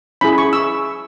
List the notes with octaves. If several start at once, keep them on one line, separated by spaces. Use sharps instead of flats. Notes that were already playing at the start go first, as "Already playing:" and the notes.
C#4 E4 G#4 B5
C#6
E6